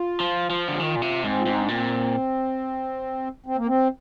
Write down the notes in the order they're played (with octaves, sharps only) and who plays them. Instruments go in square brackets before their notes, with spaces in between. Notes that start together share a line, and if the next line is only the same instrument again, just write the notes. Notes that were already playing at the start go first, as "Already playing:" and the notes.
Already playing: [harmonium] F4
[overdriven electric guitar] F3
F3
D3
[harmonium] G4
[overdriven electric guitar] D#3 [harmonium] F4
[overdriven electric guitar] A#2
C3
[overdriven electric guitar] G#2 [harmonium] C4
[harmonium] F4
[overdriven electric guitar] G#2 [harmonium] D#4
[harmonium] D4
[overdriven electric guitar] A#2 [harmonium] C4
[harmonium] C4
A#3
C4